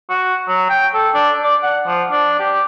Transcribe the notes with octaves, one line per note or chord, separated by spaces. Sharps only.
F#4
F#3
G5
A4
D4
D5
F#5
F3
D4
G4